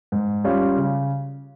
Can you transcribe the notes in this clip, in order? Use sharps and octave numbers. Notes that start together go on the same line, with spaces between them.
G#2
G3 C#4 F4
C#3